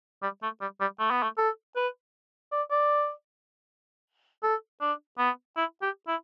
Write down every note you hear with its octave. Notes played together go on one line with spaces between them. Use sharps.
G3
A3
G3
G3
A3
B3
A3
A4
B4
D5
D5
A4
D4
B3
E4
G4
E4